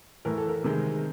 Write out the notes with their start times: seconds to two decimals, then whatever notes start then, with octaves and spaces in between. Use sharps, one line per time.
0.25 A2 E3 A3 A#4
0.38 A4
0.49 A#4
0.64 C3 D#3 G#3